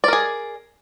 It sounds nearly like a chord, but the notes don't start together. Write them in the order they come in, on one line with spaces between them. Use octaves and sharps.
D5 A#4 G#4